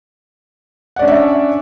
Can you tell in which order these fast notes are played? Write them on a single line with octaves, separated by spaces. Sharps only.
F#5 D5 C#4 D4 E5